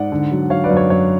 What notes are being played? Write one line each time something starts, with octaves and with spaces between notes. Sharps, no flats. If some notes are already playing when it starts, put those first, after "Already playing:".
Already playing: G#2 D5 F#5
D3
F#3
F#3 C#5 F5
B4 D5
F#2
C#5
F#2 C#5